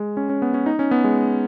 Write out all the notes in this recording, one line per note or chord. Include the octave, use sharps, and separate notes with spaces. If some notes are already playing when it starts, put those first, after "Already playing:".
Already playing: G#3
C#4
C#4
B3
C#4
D#4
C#4
B3
G#3